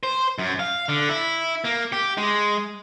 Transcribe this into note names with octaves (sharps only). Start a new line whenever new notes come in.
C5
F#2
F5
D3
E4
A#3
G4
G#3